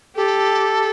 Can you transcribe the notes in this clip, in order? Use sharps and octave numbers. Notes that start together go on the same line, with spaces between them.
G4 A4